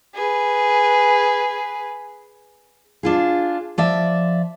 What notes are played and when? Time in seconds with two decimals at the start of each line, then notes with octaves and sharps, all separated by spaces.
0.15 G#4 B4
3.03 D4 F4 G#4
3.78 F3 D5 E5